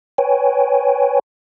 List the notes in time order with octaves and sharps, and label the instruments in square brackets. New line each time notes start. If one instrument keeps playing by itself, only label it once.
[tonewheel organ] B4 C#5 G5 G#5